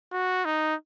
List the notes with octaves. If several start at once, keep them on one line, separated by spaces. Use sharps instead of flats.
F#4
D#4